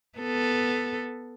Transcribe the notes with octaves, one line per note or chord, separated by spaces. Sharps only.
B3 A4